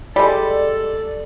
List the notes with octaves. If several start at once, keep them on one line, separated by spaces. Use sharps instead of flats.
G3 G#3 A4 D5